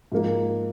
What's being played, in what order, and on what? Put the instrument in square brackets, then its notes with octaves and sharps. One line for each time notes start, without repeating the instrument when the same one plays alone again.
[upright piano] G#2 F3 A#3